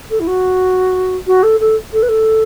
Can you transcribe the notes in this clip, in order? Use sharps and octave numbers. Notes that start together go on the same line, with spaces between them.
A4
E4
F#4
F#4
A4
A4
A4
B4
A4